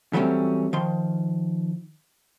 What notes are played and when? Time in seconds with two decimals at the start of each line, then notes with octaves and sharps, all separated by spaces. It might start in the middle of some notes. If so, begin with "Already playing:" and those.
0.13 E3 F#3 G3 A3 C4 C#4
0.73 D#3 F3 C6